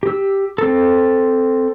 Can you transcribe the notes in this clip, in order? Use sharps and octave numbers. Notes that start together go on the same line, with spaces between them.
G4 E6
C4 A4